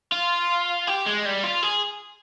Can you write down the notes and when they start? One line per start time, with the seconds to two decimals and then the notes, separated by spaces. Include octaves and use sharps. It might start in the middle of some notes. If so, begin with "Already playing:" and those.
0.12 F4
0.87 G4
1.06 G#3
1.25 G3
1.43 F4
1.63 G#4